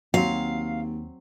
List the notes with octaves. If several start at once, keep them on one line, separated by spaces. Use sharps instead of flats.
D#2 F#3 C4 F5